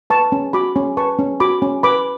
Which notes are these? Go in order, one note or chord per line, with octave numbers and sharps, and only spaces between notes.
B4 A5 C#6
C#4
F#4 B5 D6
C#4
B4 A5 C#6
C#4
F#4 B5 D6
C#4
B4 B5 D6